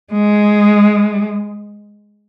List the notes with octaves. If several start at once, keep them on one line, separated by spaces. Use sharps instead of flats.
G#3